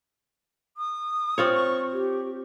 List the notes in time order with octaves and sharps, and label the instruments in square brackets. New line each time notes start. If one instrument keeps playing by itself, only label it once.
[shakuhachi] D#6
[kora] C4 F4 C#5
[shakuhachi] C#6
G4